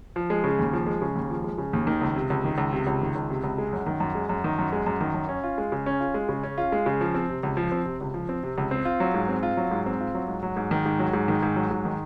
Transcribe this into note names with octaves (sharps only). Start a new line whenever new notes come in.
F3
G#3
C#3
D#2
F3
G#3
C#3
D#2
F3
G#3
C#3
D#2
D#3
C#2
C3
C#2
D#3
C#2
C3
C#2
D#3
C#2
C3
C#2
G#3
F#2
D#3
F#2
G#3
F#2
D#3
F#2
G#3
F#2
D#3
F#2
C#4
F4
G#3
C#3
C#4
F4
G#3
C#3
C#4
F4
G#3
C#3
F3
C4
C3
C#2
F3
C4
C3
C#2
F3
C4
C3
C#2
C4
F4
F#3
G#2
C4
F4
F#3
G#2
C4
F4
F#3
G#2
F#3
G#2
D#3
G#2
F#3
G#2
D#3
G#2
F#3
G#2
D#3